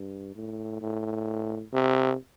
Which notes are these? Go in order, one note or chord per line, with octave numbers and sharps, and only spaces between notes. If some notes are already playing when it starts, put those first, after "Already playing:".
Already playing: G2
A2
A2
C3